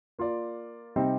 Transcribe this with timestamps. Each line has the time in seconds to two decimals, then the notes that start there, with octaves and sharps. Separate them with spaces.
0.19 A#3 F4 A#4 D5
0.96 C3 G3 C4 D#4